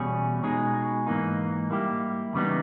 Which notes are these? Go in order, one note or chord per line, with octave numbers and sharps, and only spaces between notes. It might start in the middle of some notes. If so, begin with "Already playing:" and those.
Already playing: E2 B2 G3 C#4 G#4
B2 G#3 D#4 G#4
G#2 E3 A#3 D#4
G3 A#3 E4 G4
E2 C#3 G3 B3 D#4